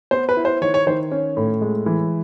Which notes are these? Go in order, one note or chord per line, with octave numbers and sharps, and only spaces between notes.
B3 C5
B4
E4
C5
D#3 C#5
C#5
D#3 C5
C#4
A2
G#3
E3